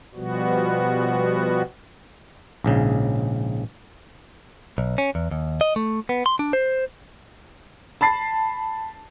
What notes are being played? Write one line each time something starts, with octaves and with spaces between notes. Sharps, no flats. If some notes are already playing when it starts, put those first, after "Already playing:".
B2 F3 G3 B3 F#4
A#1 G#2 C#3
B1
C#4
E2
D#2
D#5
A3
B3
C6
D4
C5
A5 B5 A6 C7